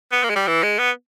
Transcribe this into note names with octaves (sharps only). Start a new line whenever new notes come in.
B3
A#3
G#3
G3
E3
G#3
B3